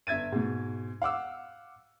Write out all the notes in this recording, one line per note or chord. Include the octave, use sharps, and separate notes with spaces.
G1 E5 G#6 A6 D#7
G#2 B2
F5 F#5 D6 E6